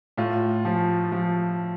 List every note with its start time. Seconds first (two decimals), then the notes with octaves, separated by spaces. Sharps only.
0.17 A2 F4
0.65 F3
1.12 F3